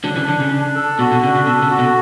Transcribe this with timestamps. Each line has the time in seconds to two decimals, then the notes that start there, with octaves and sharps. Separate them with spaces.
0.04 D3 F#3 D4
0.16 C#3 E3
0.28 D3 D4
0.40 C#3
0.51 D4
0.75 A4
0.99 B2 F#4
1.12 B2
1.23 C#3 D4
1.35 C#3
1.46 B2 A4
1.62 C#3
1.71 F#4
1.78 B2